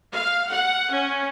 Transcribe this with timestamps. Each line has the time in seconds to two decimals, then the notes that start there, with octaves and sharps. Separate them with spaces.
0.11 F5
0.49 F#5
0.91 C#4